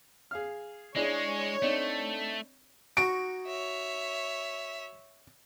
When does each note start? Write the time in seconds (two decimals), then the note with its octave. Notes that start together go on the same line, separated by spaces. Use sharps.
0.31 G#4 F5 F6
0.96 G#3 D4 E4 G#4 C#5
1.62 A3 C4 D4 D#4
2.97 D#4 F#4 C#6 D7
3.47 C#5 E5